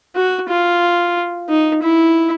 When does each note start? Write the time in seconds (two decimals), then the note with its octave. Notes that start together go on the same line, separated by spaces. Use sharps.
0.16 F#4
0.49 F4
1.49 D#4
1.83 E4